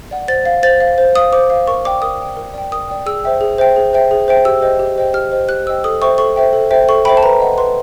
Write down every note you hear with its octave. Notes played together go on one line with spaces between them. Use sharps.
D5 F#5
C5 A6
F5
C5 A6
F5
C5
F5 D#6
C5 D6
F5
A#4 C#6
D5 G5 D6
A#4 D#6
D5 G5
A#4
D5 G5
A#4 D#6
D5 G5
G#4 E6
C5 E5 G5
G#4
C5 E5 G5
G#4
C5 E5 G5
G#4
C5 E5 G5
G4 E6
C5 D#5 G5
G4
C5 D#5 G5
G4 F6
C5 D#5 G5
G4 F#6
C5 D#5 G5 E6
A4 D#6
C5 E5 G5 C#6
A4 C#6
C5 E5 G5
A4
C5 E5 G5
A4 C#6
C5 E5 G5 B5
A5
B4 A#5
D#5 F#5
B4 C6